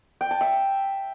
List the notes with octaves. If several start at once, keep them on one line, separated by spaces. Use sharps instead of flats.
G5
A5
E5